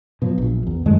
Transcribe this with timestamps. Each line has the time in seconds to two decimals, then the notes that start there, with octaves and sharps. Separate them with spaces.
0.22 B2 F3 F#3
0.38 A#1
0.67 E2
0.86 F#2 D#3 G#3 A3